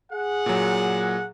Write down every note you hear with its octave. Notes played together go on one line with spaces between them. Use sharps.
G#4 F#5
A#2 F#3